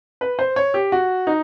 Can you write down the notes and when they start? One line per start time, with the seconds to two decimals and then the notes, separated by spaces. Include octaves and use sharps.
0.21 B4
0.39 C5
0.56 C#5
0.74 G4
0.92 F#4
1.27 D#4